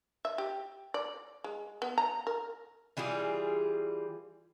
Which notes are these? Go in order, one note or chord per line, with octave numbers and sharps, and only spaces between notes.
E5
G4
D5
G#3
B3
A#5
A#4
E3 G3 F4 G#4